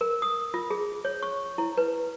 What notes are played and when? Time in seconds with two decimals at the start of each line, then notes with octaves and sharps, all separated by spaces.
0.01 A#4
0.22 D#6
0.54 F4
0.70 G#4
1.05 C#5
1.22 C#6
1.58 E4
1.77 B4